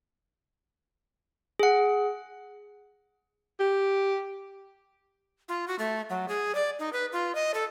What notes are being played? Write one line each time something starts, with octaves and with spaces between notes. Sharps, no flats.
G#4 F#5
G4
F4
F#4
A3
F#3
G#4
D5
D#4
B4
F4
D#5
A4